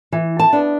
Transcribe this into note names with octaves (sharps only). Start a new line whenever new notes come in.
E3
A5
B3 D4